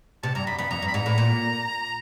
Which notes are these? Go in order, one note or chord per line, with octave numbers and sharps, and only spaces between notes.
C3 A5
G2 A#5
F#2 B5
F2 B5
F2 A#5
G2
B5
G#2 A#5
A2
A#2